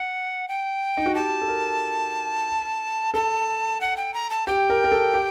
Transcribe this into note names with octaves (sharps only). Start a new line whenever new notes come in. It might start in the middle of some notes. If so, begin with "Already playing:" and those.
Already playing: F#5
G5
D#4
F#4
G4 A5
A4
A#4
A4 A5
F#5
G5
A#5
A5
G4 G5
A#4
A#4
A4
G4